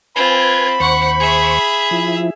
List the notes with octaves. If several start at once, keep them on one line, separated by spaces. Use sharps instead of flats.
C4 F4 B4 G#5 B5 G#6
D#2 C5 F#5 C#6
G#4 E5
F3 E4